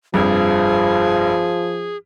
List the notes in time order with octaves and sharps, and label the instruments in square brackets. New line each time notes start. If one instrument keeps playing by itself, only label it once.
[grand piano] F1 G2 [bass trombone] F3 [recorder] G#4